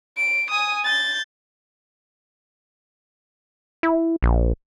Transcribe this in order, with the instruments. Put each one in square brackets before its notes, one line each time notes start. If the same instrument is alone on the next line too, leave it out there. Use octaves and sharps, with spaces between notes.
[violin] D7
G#5 D#6
G6 A6
[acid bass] E4
A#1